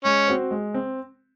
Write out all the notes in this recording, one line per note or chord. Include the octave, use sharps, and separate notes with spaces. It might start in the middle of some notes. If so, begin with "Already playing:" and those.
G#3 C#4
C4 F#4 C5
G#3
C4